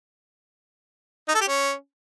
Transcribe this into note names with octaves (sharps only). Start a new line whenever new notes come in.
D#4
A4
G4
C#4